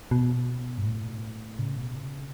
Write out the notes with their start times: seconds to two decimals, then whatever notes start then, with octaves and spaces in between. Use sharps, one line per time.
0.11 B2
0.78 G2
0.85 A2
1.59 C#3
1.77 B2
1.95 C#3